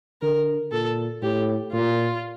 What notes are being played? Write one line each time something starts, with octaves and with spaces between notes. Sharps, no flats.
D3 A#4
A#2 A4
A2 G4
A#2 F4